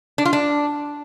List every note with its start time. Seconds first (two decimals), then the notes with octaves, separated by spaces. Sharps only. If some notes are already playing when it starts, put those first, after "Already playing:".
0.18 D4
0.25 F4
0.33 D4